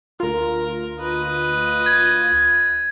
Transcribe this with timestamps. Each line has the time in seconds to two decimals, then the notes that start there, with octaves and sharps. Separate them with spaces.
0.20 D2 F4 A#4
1.00 B4 D#5
1.86 G#6